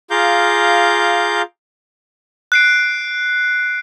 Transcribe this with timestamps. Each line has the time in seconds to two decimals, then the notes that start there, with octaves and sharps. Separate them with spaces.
0.11 F4 G#4 F5 A#5 D6 G6
2.52 F#6 C7 D7